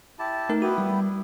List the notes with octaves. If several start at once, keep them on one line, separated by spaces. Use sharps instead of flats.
E4 G4 A5
A3 D#4 A#4
B3 E4 F#4 G4
G3